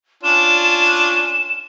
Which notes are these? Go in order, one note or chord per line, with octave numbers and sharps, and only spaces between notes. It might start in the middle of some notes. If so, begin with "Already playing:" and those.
C#4 D4 F4 E7